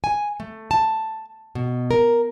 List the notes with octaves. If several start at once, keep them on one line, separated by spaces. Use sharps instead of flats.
G#5
A3
A5
B2
A#4